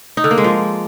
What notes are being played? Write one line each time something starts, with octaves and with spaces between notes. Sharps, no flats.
D#4
D3
A#3
G#3
F3